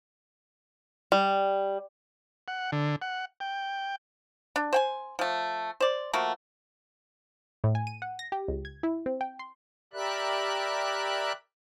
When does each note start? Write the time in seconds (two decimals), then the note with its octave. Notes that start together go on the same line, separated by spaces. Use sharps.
1.12 G3
2.48 F#5
2.72 D3
3.02 F#5
3.40 G5
4.56 D4
4.73 C5 G5 G#5
5.19 F3 A3
5.80 C5 D5
6.13 F3 A3 A#3 F#4
7.64 A2
7.75 G#5
7.87 D#7
8.02 F#5
8.19 A#6
8.32 G4
8.48 C#2
8.65 G#6
8.83 E4
9.06 C4
9.21 G5
9.39 C6
9.93 G4 A#4 D5 E5 B5 F#6